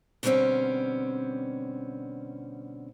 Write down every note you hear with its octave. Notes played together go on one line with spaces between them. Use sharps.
B2 D3 G3 A#3 C4 C#4